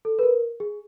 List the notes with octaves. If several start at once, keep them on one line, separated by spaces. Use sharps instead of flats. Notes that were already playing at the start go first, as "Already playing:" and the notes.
A4
B4
A#4
G#4